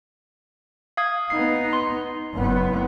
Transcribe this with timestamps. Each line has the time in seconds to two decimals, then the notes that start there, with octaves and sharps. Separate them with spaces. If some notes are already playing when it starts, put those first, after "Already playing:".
0.97 F5 D#6 G#6
1.30 B3 D#4 C7
1.73 C6
2.35 F#1 B3